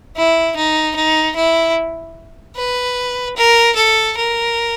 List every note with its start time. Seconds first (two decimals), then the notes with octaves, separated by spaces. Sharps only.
0.16 E4
0.56 D#4
0.96 D#4
1.36 E4
2.56 B4
3.36 A#4
3.76 A4
4.17 A#4